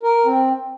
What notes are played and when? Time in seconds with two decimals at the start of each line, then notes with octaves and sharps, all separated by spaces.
0.03 A#4
0.26 C4